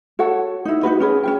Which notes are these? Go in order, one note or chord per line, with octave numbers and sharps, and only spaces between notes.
F#4 A4 C#5 F#5
D#4 E4
D#4 F4 F#4 B4
C#4 G#4 B4
C#4 F4 G5